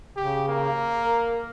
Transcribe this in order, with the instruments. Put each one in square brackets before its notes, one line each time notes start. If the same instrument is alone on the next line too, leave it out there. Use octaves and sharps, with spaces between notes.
[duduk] C#3 [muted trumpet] G4
[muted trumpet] A#3
[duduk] A#4